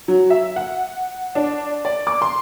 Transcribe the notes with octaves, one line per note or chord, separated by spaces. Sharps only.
F#3
E5
F#5
D4
D5
D6
C6